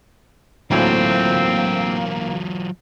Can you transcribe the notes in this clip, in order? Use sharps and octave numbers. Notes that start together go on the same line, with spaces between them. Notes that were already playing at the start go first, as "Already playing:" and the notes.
D2 A2 F#3 A#3 C4 F4 G#5